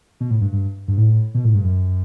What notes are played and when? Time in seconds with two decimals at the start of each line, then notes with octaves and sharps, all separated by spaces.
0.20 B2
0.30 A2
0.41 G2
0.53 G2
0.88 G2
0.98 A2
1.35 B2
1.45 A2
1.54 G2
1.64 F#2